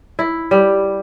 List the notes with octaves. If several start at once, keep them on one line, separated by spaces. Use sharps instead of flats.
E4
G3